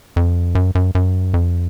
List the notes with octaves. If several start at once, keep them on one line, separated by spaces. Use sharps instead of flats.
F2
F#2
F#2
F#2
F2